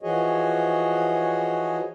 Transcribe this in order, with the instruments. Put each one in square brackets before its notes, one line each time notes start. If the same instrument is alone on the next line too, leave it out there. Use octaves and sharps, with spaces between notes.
[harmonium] E3 F3 F#4 G#4 C#5 D#5